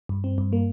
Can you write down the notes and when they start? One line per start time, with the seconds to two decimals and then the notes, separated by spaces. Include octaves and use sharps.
0.09 G2
0.24 C4
0.38 G2
0.53 A#3